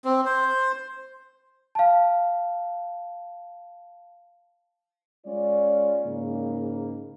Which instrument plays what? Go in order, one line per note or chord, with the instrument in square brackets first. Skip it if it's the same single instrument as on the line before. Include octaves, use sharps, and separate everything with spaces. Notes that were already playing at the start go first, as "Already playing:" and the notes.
[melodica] C4
C5
[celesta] F5 A5
[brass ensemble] G#3 C#4 F4 D5
G#2 C#3 A#3